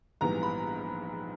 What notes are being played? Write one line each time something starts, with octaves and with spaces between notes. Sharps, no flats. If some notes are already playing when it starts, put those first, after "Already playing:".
A#1 G#2 E3 G3 B3 A#5
B5